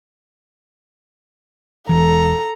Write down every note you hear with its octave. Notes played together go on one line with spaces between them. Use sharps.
E1 E3 A4 A#5